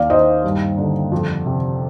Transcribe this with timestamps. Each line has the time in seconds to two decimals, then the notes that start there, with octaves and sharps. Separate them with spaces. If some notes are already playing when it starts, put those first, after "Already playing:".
Already playing: D#2 D5 F5
0.10 D#3 C5 D#5
0.44 G2
0.78 D3
1.12 F2
1.46 C3